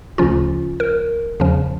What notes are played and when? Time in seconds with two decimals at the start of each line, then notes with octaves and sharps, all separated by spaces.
0.18 D2 C#3 F3 C#4 F4
0.80 A#4
1.40 E2 C#3 F3 C#4